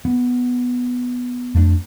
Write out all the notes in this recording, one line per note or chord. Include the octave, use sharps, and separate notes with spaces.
B3
F2 A3 A#3 D4